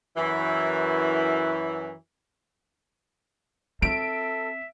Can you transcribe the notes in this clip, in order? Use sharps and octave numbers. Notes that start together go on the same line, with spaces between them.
F#2 E3
C4 A4 E5 D7